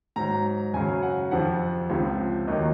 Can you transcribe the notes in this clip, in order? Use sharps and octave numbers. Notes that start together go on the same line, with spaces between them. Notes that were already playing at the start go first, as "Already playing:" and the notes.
G#2 F#3 A#5
F#2 C#3 F#3 G#5
F#5
F2 C3 F3 F#5
C#2 C3 F3
D#2 D#3 F#3 D#5